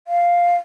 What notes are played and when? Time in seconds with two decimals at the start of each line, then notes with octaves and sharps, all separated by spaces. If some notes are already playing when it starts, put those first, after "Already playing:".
0.08 F5